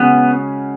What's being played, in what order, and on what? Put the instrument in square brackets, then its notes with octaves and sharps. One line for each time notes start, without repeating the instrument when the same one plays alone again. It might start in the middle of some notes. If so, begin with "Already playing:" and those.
Already playing: [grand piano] C#3 G#3 C#4 F#4 [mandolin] B3